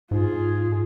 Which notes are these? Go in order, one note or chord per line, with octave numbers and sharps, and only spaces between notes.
G#2 F4 G#4